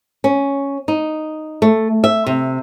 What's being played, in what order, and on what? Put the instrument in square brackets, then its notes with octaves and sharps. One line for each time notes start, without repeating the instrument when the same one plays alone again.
[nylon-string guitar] C#4
D#4
A3
E5
C3